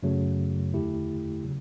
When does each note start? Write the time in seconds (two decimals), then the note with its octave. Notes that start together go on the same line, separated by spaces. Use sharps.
0.03 F#2 C#3 F#3 A3
0.73 E2 D3 A3 E4 G4
1.44 C#3 F#3